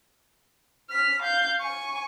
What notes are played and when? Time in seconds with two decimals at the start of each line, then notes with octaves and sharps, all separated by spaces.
0.90 F6 B6
1.22 F5 G6
1.61 G#5 C#6